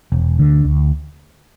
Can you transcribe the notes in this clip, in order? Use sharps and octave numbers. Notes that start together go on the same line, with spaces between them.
E1
D2 D3
D2